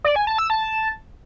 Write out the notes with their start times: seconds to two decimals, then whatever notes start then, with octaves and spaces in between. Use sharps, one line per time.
0.04 D5
0.16 G#5
0.27 A5
0.38 E6
0.50 A5